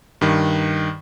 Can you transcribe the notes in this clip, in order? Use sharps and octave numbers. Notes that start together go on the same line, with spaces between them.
G2 D#3